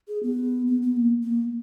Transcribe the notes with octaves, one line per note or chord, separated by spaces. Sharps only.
G#4
B3
B3
B3
A#3
A#3